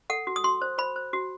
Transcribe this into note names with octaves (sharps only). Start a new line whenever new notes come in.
A4 F#5
F#4
D#6
F#4 C6
C5
C5 B5
C5
F#4